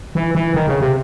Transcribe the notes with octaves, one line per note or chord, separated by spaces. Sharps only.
E3
E3
D#3
C#3
C3